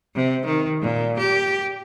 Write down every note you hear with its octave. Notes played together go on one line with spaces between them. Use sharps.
C3
D#3
A#2
G4